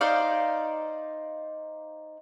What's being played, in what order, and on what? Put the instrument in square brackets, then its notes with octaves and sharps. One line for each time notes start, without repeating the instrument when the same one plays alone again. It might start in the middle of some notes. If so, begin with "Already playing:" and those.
[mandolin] D#4 C5 D5 F5